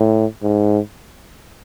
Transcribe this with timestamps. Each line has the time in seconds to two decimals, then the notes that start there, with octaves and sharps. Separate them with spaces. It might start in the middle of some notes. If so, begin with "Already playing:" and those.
Already playing: A2
0.42 G#2